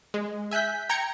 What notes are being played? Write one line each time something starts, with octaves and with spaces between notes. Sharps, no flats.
G#3
E5 G#5 F#6 G6 B6
G5 A#5 G6 G#6 C#7